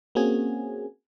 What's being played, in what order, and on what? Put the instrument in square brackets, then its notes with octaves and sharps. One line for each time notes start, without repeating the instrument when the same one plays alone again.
[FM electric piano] A#3 C4 C#4 F#4 G#4 G#5